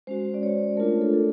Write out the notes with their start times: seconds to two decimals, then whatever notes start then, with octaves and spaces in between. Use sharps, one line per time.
0.07 G#3 C#4 F#4 C5
0.34 D5
0.43 C#5
0.77 A3 D4 F4 A#4
1.01 A4
1.14 A4